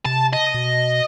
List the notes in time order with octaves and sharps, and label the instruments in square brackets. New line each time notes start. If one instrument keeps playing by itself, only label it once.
[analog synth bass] C3 [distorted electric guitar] A5
[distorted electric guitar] D#5
[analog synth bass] B2